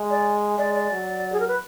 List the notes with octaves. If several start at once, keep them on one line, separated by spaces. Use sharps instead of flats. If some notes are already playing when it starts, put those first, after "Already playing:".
Already playing: G#3
D5
G#3 D5
D5
F#3
G#4
A#4
B4